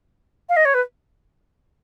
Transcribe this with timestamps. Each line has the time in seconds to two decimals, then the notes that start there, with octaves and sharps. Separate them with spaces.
0.49 F5
0.56 D#5
0.65 C#5
0.74 B4